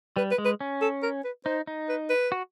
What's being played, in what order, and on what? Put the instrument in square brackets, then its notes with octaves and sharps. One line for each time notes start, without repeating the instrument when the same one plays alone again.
[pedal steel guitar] G3 [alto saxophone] B4
[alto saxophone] B4
[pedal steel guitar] G#3
[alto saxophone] B4
[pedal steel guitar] C#4
[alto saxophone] A4
A#4
B4
[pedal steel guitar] D#4 [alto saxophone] C5
[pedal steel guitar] D#4
[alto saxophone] B4
B4
[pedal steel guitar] F#4